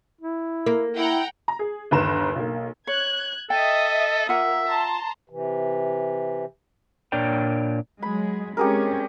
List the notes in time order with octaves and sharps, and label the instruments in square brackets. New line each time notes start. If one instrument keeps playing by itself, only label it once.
[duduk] E4
[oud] A#3
[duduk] E4 [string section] F#5 G5 A#5
[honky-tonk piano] A#5
G#4
G1 D#2 B4 A#5 E7
B1 A#3
[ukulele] C#5 [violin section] F#6 G#6
[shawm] A4 [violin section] D#5 E5 D#6 [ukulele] G5
[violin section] A#3 [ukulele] F4 F#5 [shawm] E5
[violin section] A5 A#5 C6
[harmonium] C3 E3
[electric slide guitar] A#2 D4 A#4 C#5 D5 G5
[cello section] F#3 G#3 G#4 [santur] B5
[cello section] G#3 C4 C#4 [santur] G4 G#4 A#4